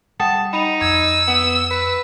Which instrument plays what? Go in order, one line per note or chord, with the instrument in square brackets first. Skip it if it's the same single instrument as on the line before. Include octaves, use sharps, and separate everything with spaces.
[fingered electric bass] G3 [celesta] F#5 G5 D#6 [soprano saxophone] A5
[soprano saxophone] D#4 [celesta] B5 F7
[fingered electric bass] F2 [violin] E6 [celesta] G#6
[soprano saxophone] B3
B4